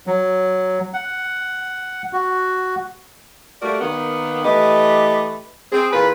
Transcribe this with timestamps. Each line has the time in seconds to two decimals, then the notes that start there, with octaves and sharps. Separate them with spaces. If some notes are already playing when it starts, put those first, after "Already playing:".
0.07 F#3
0.94 F#5
2.13 F#4
3.62 G3 A3 A#3 F#4 A#4 D5
3.81 D#3 A#3 B3
4.45 E3 A3 G4 B4 D#5
5.72 C4 G#4
5.93 E2 A#2 F4 B4